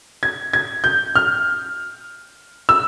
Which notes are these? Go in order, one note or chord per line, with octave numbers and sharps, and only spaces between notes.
G#6
G#6
G6
F6
E6